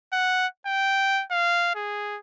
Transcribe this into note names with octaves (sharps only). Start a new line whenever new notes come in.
F#5
G5
F5
G#4